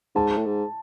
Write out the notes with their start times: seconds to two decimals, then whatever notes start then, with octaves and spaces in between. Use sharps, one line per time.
0.15 G#2 A5
0.37 A2
0.46 G#2